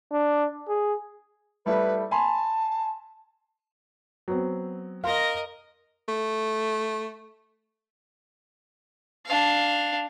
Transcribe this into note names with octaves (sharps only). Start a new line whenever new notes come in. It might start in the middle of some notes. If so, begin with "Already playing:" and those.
D4
G#4
G3 A3 E4 B4
G#5 A5 B5 C6
F#3 B3 C4
A#4 D#5 F5 C6
A3
D4 F5